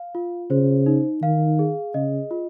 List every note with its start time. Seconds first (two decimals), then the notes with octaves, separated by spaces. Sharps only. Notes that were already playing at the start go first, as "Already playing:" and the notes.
Already playing: F5
0.15 F4
0.50 C#3 C5
0.86 D#4
1.22 D#3 F5
1.59 G#4
1.94 C#3 D#5
2.31 F4